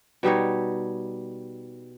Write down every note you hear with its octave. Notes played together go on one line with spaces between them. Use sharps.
B2 G3 D#4 C#5